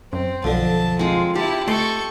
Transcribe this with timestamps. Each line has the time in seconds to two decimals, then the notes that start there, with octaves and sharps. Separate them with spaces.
0.13 F#2 C4
0.44 B1 F2 D3 A5
0.99 G#3 C4 F4
1.35 E4 G4 A5
1.68 A3 A4 D#5 G5 C6 C#6